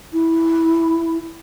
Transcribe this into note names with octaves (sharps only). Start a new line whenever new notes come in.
E4